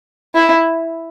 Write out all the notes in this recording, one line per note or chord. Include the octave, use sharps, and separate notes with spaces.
E4